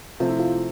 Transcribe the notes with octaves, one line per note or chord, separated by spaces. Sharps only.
C3 F3 A3 C4 F4
E4
F4